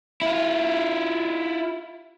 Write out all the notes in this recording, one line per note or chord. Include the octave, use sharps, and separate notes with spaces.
E4 F4